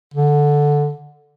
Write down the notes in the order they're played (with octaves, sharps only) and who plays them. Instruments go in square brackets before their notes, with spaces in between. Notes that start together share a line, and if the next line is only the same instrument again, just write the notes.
[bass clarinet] D3